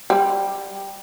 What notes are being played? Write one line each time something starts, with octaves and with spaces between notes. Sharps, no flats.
G3